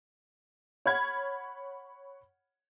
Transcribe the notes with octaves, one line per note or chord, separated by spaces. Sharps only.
C#5 F#5 B5 F6 G#6